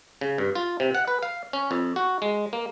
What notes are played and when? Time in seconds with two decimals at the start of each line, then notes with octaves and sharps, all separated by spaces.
0.21 C#3
0.38 G2
0.55 F4
0.80 C3
0.95 F#5
1.08 B4
1.23 F5
1.53 C#4
1.71 F2
1.96 F#4
2.22 G#3
2.53 A#3